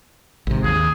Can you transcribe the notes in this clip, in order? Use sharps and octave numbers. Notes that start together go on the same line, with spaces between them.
G#1 C3
D#2 G#4